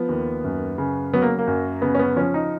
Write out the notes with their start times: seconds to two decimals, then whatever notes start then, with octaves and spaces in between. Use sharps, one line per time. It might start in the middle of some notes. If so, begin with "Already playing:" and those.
Already playing: F3 B3
0.09 D#2
0.44 F#2
0.78 C#3
1.13 F#3 B3
1.22 A#3
1.39 A#3
1.47 F#2
1.82 C#3 B3
1.95 C#4
1.99 B3
2.16 F3 C#4
2.34 D#4